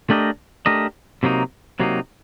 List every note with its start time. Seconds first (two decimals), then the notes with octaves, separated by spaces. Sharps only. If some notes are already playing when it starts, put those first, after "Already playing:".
0.10 A3 D4 G4 A#4 D#5
0.66 A3 D4 G4 A#4 D#5
1.23 C3 F#3 A#3 D#4
1.80 C3 F#3 A#3 D#4